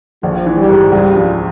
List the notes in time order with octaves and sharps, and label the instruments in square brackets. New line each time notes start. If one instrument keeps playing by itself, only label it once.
[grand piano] A#1 [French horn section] F3
[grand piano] E3
[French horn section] G3
[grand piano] G#2
[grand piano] C#2 [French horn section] G3
[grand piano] F3